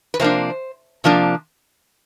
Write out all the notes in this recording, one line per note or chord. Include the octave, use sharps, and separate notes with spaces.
B4
C3 F3 A#3 D4 C5
C3 F3 A#3 D4